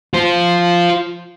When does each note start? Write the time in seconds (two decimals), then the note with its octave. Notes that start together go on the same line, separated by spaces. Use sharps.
0.14 F4 C5